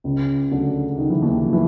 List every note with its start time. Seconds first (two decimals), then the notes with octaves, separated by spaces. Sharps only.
0.04 C#2 C#3
0.51 D2 D3
0.98 D#3
1.10 E3
1.22 D#2 D#3
1.44 F3
1.53 E3